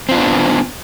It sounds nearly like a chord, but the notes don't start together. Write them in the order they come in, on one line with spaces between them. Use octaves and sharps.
C4 F4 B3 D4